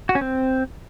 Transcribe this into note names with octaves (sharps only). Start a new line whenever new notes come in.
F#4
C#4
C4